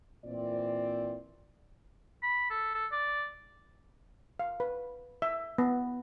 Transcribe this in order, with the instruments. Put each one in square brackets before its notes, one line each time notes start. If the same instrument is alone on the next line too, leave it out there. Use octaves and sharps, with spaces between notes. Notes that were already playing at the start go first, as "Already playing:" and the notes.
[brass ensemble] A#2 E3 C4 D5
[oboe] B5
A4
A4
D5
[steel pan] F5
B4
E5
B3